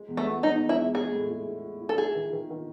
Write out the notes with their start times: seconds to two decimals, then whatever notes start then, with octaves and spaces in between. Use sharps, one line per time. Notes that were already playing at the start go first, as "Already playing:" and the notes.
Already playing: G#3
0.08 E2
0.17 A3
0.25 B3
0.43 B3 D#4
0.60 E2
0.69 E4
0.77 G#3
0.95 G#3 G#4
1.13 A2
1.30 E4
1.47 G#3
1.63 E4
1.81 E4
1.89 A4
1.97 E4 G#4
2.15 D#3
2.32 D#3
2.50 D#3